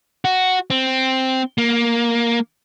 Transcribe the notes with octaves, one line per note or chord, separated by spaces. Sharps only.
F#4
C4
A#3